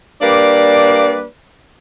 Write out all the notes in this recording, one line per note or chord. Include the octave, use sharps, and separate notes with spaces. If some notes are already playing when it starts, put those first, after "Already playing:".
G3 A#3 D4 B4 D5